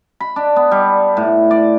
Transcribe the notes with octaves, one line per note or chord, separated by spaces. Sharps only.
B5
D4
B3
G3
A2
D5